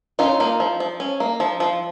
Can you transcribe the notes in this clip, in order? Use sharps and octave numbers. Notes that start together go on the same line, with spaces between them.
C#4 D#4 F4
A#3
F3
F3
C#4
A#3
F3
F3